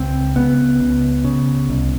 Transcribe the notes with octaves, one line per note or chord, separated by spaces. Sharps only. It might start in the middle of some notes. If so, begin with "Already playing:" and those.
Already playing: C#2 C4
C#3 B3
C#2
C#3
C2